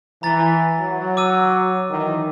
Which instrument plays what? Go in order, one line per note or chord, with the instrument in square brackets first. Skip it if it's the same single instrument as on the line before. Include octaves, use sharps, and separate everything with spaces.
[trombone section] E3 [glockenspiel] A#5 A6
[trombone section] F#3
[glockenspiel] D6 E6 D#7
[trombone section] D#3 E3